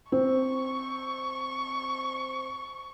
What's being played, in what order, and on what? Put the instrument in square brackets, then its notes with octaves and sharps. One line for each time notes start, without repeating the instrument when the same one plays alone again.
[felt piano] C4 [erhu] C#6